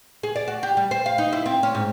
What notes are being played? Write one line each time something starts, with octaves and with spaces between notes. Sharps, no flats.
G#4
D5
F#4
G4
G3
C5
F5
D#4
E4
C4
C#4
G#2